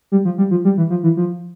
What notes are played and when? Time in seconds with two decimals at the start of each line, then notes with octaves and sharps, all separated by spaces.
0.12 G3
0.25 F3
0.38 G3
0.51 F3
0.65 G3
0.78 E3
0.90 F3
1.03 E3
1.17 F3